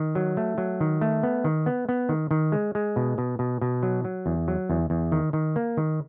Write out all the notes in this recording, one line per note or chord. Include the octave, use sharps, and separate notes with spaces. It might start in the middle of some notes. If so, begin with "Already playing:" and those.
Already playing: D#3
F#3
A3
F#3
D#3
A3
B3
D#3
B3
B3
D#3
D#3
G#3
G#3
B2
B2
B2
B2
F#3
F#3
E2
F#3
E2
E2
D#3
D#3
A#3
D#3